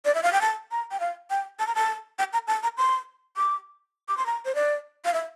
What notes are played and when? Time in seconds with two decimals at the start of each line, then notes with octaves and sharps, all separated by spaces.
0.05 D5
0.15 E5
0.23 F5
0.33 G5
0.41 A5
0.71 A#5
0.91 G5
1.00 F5
1.30 G5
1.59 A5
1.67 A#5
1.75 A5
2.19 G5
2.33 A#5
2.47 A5
2.63 A#5
2.77 C6
3.37 D6
4.08 D6
4.17 C6
4.26 A#5
4.45 C5
4.55 D5
5.05 F5
5.14 E5